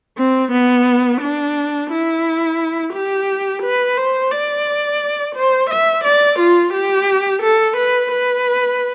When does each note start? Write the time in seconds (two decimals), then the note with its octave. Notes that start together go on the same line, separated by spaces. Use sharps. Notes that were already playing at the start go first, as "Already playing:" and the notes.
0.18 C4
0.52 B3
1.21 D4
1.90 E4
2.94 G4
3.63 B4
3.97 C5
4.31 D5
5.35 C5
5.70 E5
6.04 D5
6.39 F4
6.73 G4
7.42 A4
7.77 B4
8.12 B4